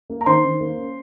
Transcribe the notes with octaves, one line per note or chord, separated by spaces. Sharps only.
A#3
A#5
D#3 C5 C6
D#3
A#3
C#4